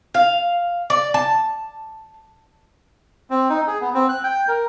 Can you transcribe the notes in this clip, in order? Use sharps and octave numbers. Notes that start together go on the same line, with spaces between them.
F5
D5
A5
C4
D#4
G#4
B3
C4
F#6
G5
A#4